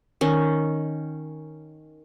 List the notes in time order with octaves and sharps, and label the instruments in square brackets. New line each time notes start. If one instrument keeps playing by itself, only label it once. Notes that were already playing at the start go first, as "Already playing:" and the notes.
[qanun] D#3 C#4